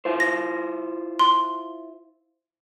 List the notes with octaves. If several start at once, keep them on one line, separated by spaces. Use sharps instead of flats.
E4 F4 C5
A#6
C6